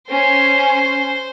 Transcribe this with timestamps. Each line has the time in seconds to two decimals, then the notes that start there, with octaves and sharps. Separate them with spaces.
0.10 C#4 C5 C6